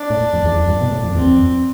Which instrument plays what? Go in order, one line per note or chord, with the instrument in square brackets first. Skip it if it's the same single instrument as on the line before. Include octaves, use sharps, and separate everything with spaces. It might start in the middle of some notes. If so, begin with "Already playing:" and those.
Already playing: [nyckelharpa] D4
[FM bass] A2
F2
E2
F2
G2
B2
A2
F2
[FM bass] E2 [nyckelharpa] C4
[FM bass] F2